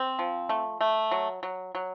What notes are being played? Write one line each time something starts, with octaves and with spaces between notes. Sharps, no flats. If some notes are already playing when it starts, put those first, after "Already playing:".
Already playing: C4
F3
A3
A3
F#3
F#3
F#3